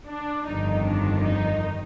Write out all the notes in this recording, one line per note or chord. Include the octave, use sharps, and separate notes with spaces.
D4
G1 F2 D#3 D#4
D4
D#4